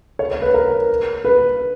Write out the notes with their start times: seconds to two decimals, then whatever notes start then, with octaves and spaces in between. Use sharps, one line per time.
0.19 C#5
0.31 C#5
0.42 B4
0.54 A#4
1.25 B4